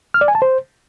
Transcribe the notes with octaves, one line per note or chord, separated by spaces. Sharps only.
F6
D5
G#5
A5
C5